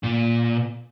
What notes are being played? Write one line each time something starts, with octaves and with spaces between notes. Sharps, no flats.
A#2